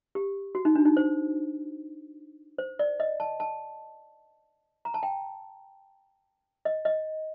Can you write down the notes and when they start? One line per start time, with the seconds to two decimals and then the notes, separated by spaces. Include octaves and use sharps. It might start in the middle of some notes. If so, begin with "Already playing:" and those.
0.15 G4
0.55 F#4
0.65 D#4
0.75 D4
0.85 D#4
0.97 C5
2.58 C5
2.79 D5
3.00 D#5
3.20 A5
3.40 A5
4.85 A#5
4.94 A5
5.03 G5
6.65 D#5
6.85 D#5